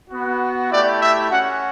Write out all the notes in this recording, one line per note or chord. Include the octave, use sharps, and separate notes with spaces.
B3 F#4
A3 E4 G4 D5
E5
C#4 F#4 F#5